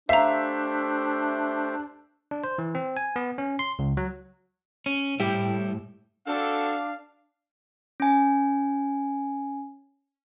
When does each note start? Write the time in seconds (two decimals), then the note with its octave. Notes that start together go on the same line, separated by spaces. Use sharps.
0.09 A3 D4 G4 C5 E5 F5 A#5
2.31 D4
2.44 C5
2.58 E3
2.75 C4
2.97 G#5
3.16 B3
3.38 C#4
3.59 C6
3.79 C#2
3.97 F#3
4.86 C#4
5.20 A2 G3 E4 G4 G5
6.26 C4 D4 F#4 A4 F5
8.00 C#4 G#5